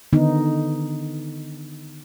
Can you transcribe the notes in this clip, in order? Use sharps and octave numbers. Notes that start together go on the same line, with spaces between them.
D3 D#3 B3 D#4